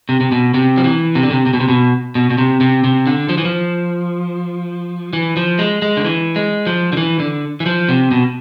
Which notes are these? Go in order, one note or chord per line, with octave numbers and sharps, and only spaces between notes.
C3
C3
B2
C3
F3
E3
C3
D3
C3
C3
B2
C3
B2
B2
B2
C3
C3
C3
D3
F3
E3
F3
E3
F3
G#3
G#3
D3
E3
G#3
F3
D3
E3
D3
E3
F3
C3
B2